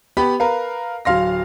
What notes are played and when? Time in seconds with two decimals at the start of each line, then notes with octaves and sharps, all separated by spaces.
0.17 B3 G4 B5
0.40 A#4 B4 F5
1.05 D1 F#3 F5 C6 A#6